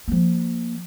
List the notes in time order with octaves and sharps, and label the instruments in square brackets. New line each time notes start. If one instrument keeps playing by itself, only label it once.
[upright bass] F3 A#3